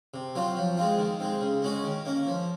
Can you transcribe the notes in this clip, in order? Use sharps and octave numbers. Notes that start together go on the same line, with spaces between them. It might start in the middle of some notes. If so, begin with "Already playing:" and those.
C3
F#3 C4 F4
F3
G#3 C4 F4
D#3
G#3 C4
C#3
G#3 C#4 F#4
D#3
A#3 C#4
F3